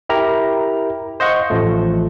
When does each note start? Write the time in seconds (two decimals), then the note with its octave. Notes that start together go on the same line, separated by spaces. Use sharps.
0.09 E4 G4 A#4 A#5
1.20 C5 D#5 F5 F#5 C#6
1.50 A1 F3 A3